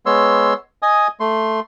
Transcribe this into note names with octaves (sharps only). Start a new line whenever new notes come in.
G#3 B3 C#5 C6 E6
D#5 G#5 D#6
A3 C6